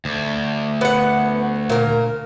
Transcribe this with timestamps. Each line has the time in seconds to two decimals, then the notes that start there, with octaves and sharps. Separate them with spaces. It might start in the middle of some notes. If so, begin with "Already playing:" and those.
0.05 D2
0.81 B3 F#5
1.70 A#2 A#4